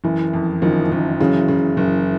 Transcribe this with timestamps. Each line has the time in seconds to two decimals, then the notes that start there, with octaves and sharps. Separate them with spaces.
0.04 F#1 E3
0.33 F2
0.62 F#1 D#3 F3
0.92 F#1
1.20 C#3 E3 F#3
1.48 C#3
1.77 F#1